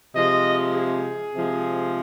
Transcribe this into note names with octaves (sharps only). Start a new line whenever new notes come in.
C3 F3 G#3 D#5
G#4
C3 F3 G#3